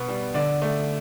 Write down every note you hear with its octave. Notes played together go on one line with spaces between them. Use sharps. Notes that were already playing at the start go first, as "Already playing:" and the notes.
Already playing: B2 B3
G3
D3 D5
A3